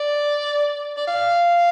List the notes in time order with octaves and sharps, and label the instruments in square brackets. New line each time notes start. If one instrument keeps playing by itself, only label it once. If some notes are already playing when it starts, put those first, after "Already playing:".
Already playing: [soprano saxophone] D5
D5
F5